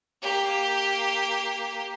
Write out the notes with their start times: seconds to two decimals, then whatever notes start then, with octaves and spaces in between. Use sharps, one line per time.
0.22 A#3 G4